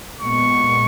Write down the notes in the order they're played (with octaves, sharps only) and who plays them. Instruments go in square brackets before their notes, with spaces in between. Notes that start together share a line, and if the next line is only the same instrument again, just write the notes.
[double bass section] A#2 G#3 B3 [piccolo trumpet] C#6